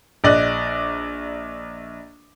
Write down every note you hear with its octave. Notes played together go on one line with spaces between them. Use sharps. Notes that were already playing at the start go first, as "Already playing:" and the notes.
A#1 D5 D#5 F#6